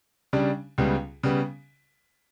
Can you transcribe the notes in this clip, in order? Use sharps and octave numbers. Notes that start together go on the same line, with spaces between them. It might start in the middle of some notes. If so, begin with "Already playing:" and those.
C#3 G3 D4
C#2 C#3 G3 B3
C#3 G3 B3